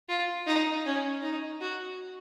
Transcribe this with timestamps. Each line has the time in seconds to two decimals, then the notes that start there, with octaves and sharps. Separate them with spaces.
0.09 F4
0.47 D#4
0.86 C#4
1.23 D#4
1.61 F#4